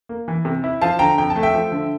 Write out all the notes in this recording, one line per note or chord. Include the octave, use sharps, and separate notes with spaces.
A#3
E3
C3
E4
F3 F5 A5
D3 G5 A#5
F2 G5
A5
A3
E5 G5
F3
D3